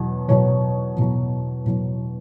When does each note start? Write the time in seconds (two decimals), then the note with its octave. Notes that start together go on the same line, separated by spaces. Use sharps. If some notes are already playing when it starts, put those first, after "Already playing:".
Already playing: E2 B2 F#3
0.28 E2 B2 F#3 C#5
0.97 E2 B2 F#3
1.65 E2 B2 F#3